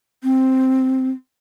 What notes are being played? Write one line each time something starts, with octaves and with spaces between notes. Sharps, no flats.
C4